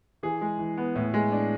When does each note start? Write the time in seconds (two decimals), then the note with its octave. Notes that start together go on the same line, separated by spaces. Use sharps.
0.23 E3 G#4
0.42 G#3
0.59 E3
0.77 B3
0.95 A2
1.14 G#3
1.32 D4